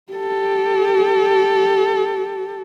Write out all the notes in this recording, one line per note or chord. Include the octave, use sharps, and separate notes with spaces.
G4 A4